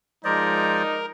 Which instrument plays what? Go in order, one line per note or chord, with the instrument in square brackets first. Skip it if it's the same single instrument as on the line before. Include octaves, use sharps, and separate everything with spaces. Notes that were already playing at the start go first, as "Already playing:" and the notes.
[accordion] F3 G#3 [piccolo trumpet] D#4 [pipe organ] A#4 [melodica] C5 D5 D#5